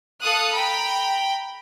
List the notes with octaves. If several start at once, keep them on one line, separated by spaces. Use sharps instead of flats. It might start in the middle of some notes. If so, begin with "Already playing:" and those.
A4 F5 D#6 F#6
G5 A#5 B5